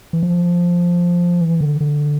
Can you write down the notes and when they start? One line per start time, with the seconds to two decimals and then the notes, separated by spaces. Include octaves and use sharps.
0.13 E3
0.23 F3
1.41 E3
1.61 D3
1.81 D3